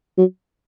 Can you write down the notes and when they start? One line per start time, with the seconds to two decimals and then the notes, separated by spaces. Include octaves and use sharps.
0.18 F#3